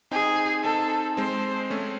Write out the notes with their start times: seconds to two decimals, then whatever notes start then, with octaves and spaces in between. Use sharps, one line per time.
0.11 C4 D#4 G#4
0.64 C4 D#4 A4
1.17 G#3 C4 C5
1.70 A3 C#4